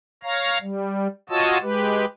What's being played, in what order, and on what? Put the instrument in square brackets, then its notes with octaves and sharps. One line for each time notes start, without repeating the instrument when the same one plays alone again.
[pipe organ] C#5 F5 A#5
G3
F4 F#4 C#5 D#5 A5 E6
G#3 G4 B4